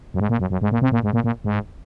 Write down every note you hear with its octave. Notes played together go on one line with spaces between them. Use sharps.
F#2
G#2
A#2
F#2
F#2
G#2
A#2
C3
A#2
G#2
A#2
A#2
G#2